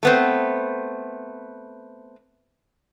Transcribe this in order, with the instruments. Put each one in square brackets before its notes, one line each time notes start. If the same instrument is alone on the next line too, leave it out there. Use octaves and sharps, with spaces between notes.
[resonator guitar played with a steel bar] A3 B3 C4